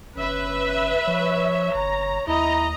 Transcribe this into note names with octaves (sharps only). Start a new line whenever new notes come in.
G1 C#4 B4 E5
F3 C#5
G1 A#5
D#2 E4 D#5 A#5